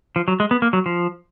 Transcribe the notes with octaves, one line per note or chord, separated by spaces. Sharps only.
F3
F#3
G#3
B3
A#3
F#3
F3